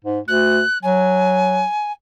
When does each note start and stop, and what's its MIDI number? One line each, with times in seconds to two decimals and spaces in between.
0.04 0.19 44
0.28 0.61 38
0.28 0.78 90
0.83 1.63 54
0.83 1.92 80